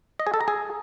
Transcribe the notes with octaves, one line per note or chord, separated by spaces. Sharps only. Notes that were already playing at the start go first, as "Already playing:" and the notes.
D#5
G#4
A4
A#5
G#4